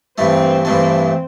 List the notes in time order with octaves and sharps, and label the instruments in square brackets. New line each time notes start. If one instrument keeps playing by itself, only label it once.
[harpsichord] G2 E3 A3 [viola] C4
[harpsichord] G2 E3 A3 [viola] C4